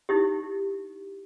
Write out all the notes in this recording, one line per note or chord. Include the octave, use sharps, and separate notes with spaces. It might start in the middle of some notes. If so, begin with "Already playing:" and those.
D#4 E4 G4